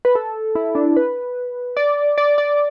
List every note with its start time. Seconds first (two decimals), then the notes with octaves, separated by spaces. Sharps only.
0.05 B4
0.15 A4
0.55 E4
0.75 D4
0.96 B4
1.77 D5
2.18 D5
2.38 D5